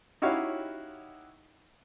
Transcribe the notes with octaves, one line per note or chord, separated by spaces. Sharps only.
D#4 E4 F#4 G4 C#5 F5